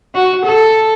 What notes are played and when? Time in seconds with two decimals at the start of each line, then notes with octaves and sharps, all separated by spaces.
0.15 F#4
0.45 A4